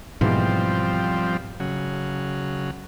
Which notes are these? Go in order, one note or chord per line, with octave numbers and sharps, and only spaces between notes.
G#2 B2 E3 F3 G3 C4
C#3 F#3